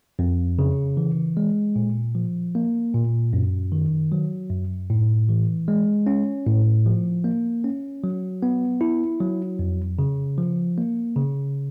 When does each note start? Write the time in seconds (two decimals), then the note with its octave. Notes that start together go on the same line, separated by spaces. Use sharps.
0.19 F2
0.59 C#3
0.97 E3
1.37 G#3
1.76 A#2
2.15 F3
2.55 A#3
2.94 A#2
3.33 F#2
3.72 D#3
4.12 F#3
4.50 F#2
4.90 A2
5.29 E3
5.68 G#3
6.07 C#4
6.46 A2
6.86 F3
7.24 A#3
7.64 C#4
8.04 F#3
8.43 B3
8.81 E4
9.21 F#3
9.59 F2
9.99 C#3
10.38 F3
10.78 A#3
11.16 C#3